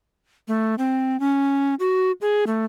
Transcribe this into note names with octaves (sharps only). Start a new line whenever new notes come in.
A3
C4
C#4
F#4
G#4
A3